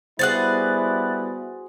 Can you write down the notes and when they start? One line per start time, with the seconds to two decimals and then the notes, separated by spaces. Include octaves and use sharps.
0.19 G3 B3 E4 F#4 G#4 C5 F#6 A6